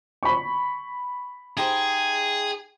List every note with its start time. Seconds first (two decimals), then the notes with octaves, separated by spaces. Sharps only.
0.23 B5 C#6
1.57 D#4 G4 G#4 C5